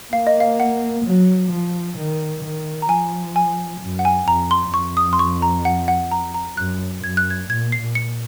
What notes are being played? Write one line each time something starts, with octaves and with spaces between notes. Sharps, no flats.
A#3 F5
D#5
F5
F#5
F#3
F3
D#3
D#3
A#5
F3 G#5
G#5
F#2
F#5
G#5
F2 A#5
C6
F2 C#6
D#6
C6
C#6
A#5
F#5
F#5
A#5
A#5
F#2 F#6
F#2 G#6
F#6
G#6
A#2 G#6
C7
A#2
C#7